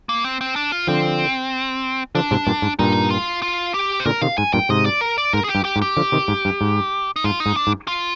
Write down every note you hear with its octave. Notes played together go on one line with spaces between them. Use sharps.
A#3
C4
C4
D4
F4
D3 F3 C4
D3 F3 D4
G#2 C3
G2 A#2
G#2
G2 A#2 D#4
F4
F4
G4
C5
A#2 D3 A#4
C3 D#3 F5
G#2 G#5
G2 A#2 G5
G#2 C3 D#5
D5
A#4
D5
G#2 A#4
G#4
G4
G2
G4
G#2
G4
D3 F3
C3 D#3
G#2
G2
G#2
D#4
G#2 F4
D#4
G#2
D4
G#2
F4